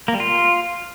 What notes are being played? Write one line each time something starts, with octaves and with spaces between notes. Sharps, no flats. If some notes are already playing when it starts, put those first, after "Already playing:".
A#3
G3
F4